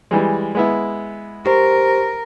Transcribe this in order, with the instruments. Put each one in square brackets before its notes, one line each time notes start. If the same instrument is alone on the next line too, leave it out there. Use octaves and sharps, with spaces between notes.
[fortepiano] E3 G3 G#3
G#3 B3 E4
[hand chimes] G4 C5 [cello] A#4